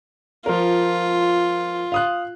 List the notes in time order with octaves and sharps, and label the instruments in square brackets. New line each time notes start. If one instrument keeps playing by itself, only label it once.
[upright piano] F3 A#4 [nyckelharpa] F4
[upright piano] F5 D#6 F#6